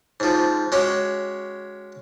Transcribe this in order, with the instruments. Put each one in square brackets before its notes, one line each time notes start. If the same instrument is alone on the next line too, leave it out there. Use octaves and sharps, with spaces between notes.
[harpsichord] G#2 F3
G#3 C#4 F#4 G4